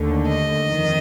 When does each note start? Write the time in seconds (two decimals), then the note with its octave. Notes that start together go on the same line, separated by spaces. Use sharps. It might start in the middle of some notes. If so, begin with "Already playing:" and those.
Already playing: D#2 D3 A3
0.28 D#5
0.68 F2 D#3